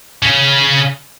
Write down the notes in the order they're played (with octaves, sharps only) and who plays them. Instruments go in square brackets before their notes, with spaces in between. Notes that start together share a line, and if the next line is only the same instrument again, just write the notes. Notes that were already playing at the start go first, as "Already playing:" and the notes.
[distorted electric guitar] C#3 C#4